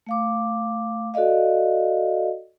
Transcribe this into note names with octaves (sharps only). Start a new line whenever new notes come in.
A3 F5 D6
F#4 A4 D5 D#5 F5